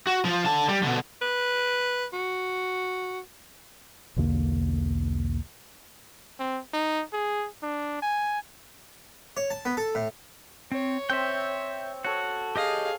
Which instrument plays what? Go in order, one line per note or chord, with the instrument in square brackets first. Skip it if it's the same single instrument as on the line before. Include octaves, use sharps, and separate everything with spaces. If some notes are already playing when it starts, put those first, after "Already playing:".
[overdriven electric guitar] F#4
F3 F4
D3 A5
G3
B2 D3
[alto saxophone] B4
F#4
[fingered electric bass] B1 E2 D3 A#3
[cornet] C4
D#4
G#4
D4
G#5
[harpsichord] C#5
A5
B3
A4
A2
[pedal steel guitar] C4 [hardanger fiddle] C#5
[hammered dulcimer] C4 [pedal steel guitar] E5 G5
[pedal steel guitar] F#4 [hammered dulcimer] A4 C#5
[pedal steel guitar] G4 D#5 D#6 [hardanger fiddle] G#4 F5